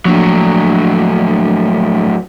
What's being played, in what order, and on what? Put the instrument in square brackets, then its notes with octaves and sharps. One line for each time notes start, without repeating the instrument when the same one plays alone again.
[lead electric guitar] A2 F#3 [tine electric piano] F3 A#3 D4